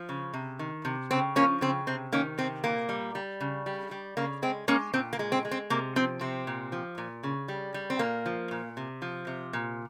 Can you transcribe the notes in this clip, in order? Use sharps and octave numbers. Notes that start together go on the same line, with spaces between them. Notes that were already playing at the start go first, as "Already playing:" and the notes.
Already playing: F3
C#3
C3
D#3
C3
C#3 C4
F3 A#3 C#4
C#3 C4
C3 C4
D#3 A#3 C#4
C3 C4
A#2 A#3
G3
G3
C#3
G3
G3
C#3 A#3
G#3 C4
G#3 A#3 C#4
A#2 C4
A#3
G#3
C4
G#3
C4
C3 A#3
F3 C4
C3 C4
A#2
F3
A#2
C#3
G3
G3
C4
A#2 A#3
F3
A#2
C3
F3
C3
A#2